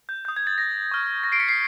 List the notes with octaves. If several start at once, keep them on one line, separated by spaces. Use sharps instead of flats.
G6
D#6 G6
G#6
A6
A#6
C#6 F6
A#6
C7 D7
B6 C#7
C7